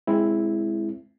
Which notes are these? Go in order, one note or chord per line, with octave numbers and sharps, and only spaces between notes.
G#3 C4 E4